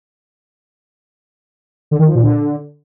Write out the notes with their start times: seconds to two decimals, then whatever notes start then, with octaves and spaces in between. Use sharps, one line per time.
1.91 D3
1.99 D#3
2.07 F3
2.15 A#2
2.22 D3